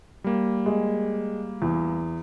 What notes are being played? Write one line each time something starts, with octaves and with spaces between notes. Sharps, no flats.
G3 A#3
G#3
E2